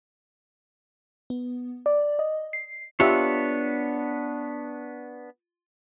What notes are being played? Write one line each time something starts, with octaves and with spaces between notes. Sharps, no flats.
B3
D5
D#5
C7
B3 D4 F4 G4 C#5 E5